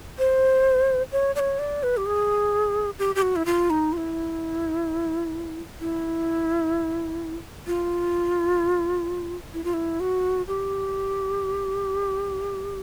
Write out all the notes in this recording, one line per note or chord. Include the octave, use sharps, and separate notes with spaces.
C5
C#5
D5
C#5
D5
B4
G4
G#4
G4
G4
F#4
E4
F4
D#4
F4
E4
E4
F4
E4
F4
E4
F#4
G4